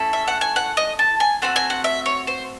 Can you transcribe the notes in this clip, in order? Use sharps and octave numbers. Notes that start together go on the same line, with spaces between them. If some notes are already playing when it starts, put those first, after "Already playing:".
Already playing: A3 C#4 E4 A4
E5
F#5
G#5
F#5
D#5
A5
G#5
A3 C4 F#4 F#5
G#5
F#5
E5
C#5
C5